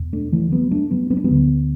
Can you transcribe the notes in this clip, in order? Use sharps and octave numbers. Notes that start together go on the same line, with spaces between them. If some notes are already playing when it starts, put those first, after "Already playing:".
Already playing: E2 B2
A3 D4
E3 A3
F#3 B3
A3 D4
F#3 B3
B3
D4
F#3 B3
D2 D3